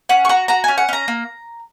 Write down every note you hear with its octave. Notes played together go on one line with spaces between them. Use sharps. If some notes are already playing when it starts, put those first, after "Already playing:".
C#4 F#5
C#6
F#4 A#5
F#4 A#5
C#4 G#5
F#5
C#4 A#5
A#3